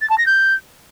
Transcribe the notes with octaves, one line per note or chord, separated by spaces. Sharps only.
A6
A5
A#6
G6